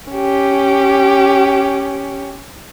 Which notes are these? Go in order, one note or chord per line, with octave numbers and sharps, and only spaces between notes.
C#4 G4